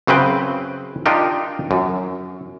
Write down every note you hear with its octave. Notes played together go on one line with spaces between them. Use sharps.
F#2 C#3 C4 B4 G5
D4 D#4 F4 G4 A#4
F#2